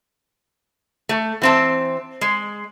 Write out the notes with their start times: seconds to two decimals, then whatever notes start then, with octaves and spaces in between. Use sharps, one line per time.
1.09 A3
1.42 E3 C4 A5
2.21 G#3